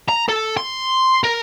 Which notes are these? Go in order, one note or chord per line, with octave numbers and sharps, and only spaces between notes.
A#5
A4
C6
A#4